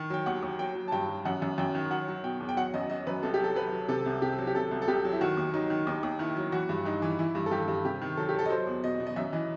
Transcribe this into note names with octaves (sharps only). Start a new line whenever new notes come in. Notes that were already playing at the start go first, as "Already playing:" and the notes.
Already playing: D#3
F#3 G5
D#2 F#5
D#2
F#3 G5
F#3
A5
G2 G5
F#3
F#2 F#5
F#2
F#2 G5
D#3
F#3 F#5
F#3
B2 G5
E2
G5
F#3 F#5
F#2 D#5
F#3 D#5
F#2 B4
C2 A4
G4
F#3 A4
F#3 B4
F#3
C3 A4
C2
C3 G4
F#3
G4
C3 A4
C2
A4
C2 G4
F#3
E4
D#3 F#4
D#2
F#3 D#4
D#3
D#2 D#4
D#2
D#3 E4
F#3
E3 F#4
G2
G2 D#4
E3
E3 E4
G2
A4
G2 G4
G2
C3 G4
D#3
F#3 A4
G4
F#3 A4
D#5
F#3 C5
E2
B2 D#5
B2
D#5
F#2 E5
E3 D#5